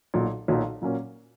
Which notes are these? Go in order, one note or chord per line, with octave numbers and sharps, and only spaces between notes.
B1 A#2 F#3
B1 A#2 F#3
A#2 F#3 A#3 C#4